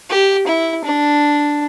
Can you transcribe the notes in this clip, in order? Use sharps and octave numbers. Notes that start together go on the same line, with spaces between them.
G4
E4
D4